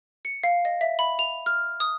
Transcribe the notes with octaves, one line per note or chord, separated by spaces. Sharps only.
C#7
F5
D#5
E5
B5
F7
F6
D#6